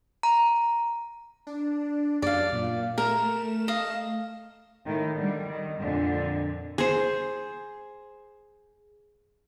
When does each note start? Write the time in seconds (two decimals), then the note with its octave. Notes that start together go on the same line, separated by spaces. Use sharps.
0.23 A#5
1.47 D4
2.22 F#2 D4 D5 F5
2.53 A#2
2.98 A3 A#4 E7
3.68 D#5 F5
4.86 A2 D#3
5.16 D3 G3
5.48 D#3
5.81 F2 A#2 D3
6.78 G#4 C5